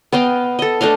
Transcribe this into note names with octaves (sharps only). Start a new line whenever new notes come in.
B3 D#5 F5 G5
A4 D#5
A3 D4 D#5 F5